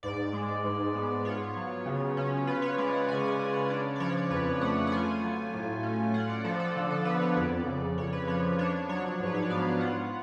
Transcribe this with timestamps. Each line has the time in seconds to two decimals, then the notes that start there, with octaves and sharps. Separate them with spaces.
0.03 G#2 D5
0.33 G#3
0.64 G#2
0.95 B3
1.25 F4 C#5
1.56 F#3
1.86 C#3
2.17 C#4
2.47 F4 B4
2.62 C#5
2.78 G#3 D5
2.93 F#5
3.08 C#3 G#5
3.24 G#5
3.39 C#4 F#5
3.54 F#5
3.70 D4 D5
3.96 D5
4.00 F3 C#5
4.31 F2 B4
4.61 A3 F#5
4.87 F#5
4.92 F4 G#5
5.22 F#3
5.54 A2
5.83 C#4
6.14 F4 F#5
6.30 D5
6.45 F3 A4
6.60 A4
6.76 D3
6.91 A4
7.05 B3 B4
7.21 C#5
7.37 F2 D5
7.67 C#3
7.98 F2 C#5
8.13 B4
8.27 F3 C#5
8.59 D4 C#5
8.89 F#3 C#5
9.20 G#2
9.27 B4
9.35 C#5
9.42 D5
9.50 B3 F5
9.80 F4 F#5